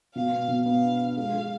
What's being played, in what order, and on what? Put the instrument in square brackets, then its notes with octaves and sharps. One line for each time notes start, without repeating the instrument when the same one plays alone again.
[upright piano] B2 [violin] F5
[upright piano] B3
B2
[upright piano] B3 [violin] F5
[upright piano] D4
D4
[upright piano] G#3 [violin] F5
[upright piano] G#3